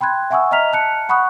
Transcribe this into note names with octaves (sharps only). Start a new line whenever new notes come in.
G5 B5 C6 F#6 G#6
E5 F#5 G#5 C#6 D#6 E6
D#5 E5 A#5 F6 B6 F7
A5 F#6 C#7
F#5 B5 C#6 D#6 F#6